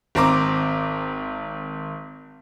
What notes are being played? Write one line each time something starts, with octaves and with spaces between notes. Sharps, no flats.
G#1 C4 A#5 D6